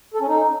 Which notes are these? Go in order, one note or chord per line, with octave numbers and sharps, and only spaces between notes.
A4
C#4
D#4